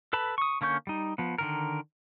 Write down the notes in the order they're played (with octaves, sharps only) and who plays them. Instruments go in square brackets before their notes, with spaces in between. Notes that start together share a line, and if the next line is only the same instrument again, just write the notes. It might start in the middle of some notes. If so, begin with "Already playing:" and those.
[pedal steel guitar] A4 B4 A5 B5
C#6 D#6
D3 A#3 C#4 C#6 G6
G3 D#4
F3 B3
D3 D#3 A#4